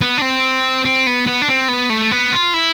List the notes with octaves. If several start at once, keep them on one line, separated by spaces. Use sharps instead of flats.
B3
D4
C4
C4
B3
B3
D4
C4
B3
A3
B3
F4
E4